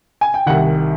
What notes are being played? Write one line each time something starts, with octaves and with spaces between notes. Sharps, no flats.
G#5
G5
C2 C3 D#3 F#5